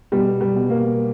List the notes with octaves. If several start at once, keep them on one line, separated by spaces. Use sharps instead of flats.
B2 G3
G3
B2
A#3